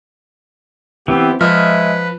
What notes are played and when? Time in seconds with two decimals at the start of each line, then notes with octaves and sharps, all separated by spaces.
1.08 E3 B3 C4 G4
1.41 F3 G#3 B4 E5 F6